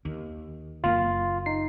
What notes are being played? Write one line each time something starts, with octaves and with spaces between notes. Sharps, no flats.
D#2
F#1 A#3 F4
D#4 C7